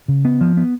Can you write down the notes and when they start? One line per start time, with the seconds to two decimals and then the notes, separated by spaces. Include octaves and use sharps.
0.08 C#3
0.25 B3
0.41 F3
0.57 B3